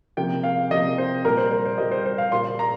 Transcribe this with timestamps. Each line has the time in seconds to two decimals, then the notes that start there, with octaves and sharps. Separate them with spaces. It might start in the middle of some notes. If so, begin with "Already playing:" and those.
0.17 C3 F3 A#3 G5
0.43 F5
0.71 C3 F3 A#3 D#5
0.98 C5
1.25 A#2 G3 A#3 A#4
1.37 C5
1.51 C5
1.65 C5
1.78 A#2 G3 A#3 D#5
1.91 C5
2.05 C5
2.18 F5
2.32 A#2 A#3 C6
2.59 A#5